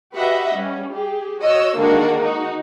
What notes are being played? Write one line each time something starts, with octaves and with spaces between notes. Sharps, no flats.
F#4 G4 B4 D#5 E5 F#5
G3 C#4
G4 G#4
F#4 C#5 D#5 E6
D3 D#3 G#3 A#3 D4 F#4
D#4 F#4